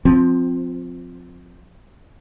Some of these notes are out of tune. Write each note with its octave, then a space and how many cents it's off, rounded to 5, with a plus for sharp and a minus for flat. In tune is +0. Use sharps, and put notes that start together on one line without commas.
F3 +15 C4 -5